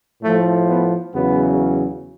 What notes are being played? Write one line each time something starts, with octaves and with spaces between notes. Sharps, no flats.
A2 F3 A3
B3
E2 C#3 F#3 B3